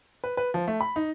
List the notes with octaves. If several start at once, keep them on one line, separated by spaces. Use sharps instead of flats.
B4
B4
F3
A3
B5
D#4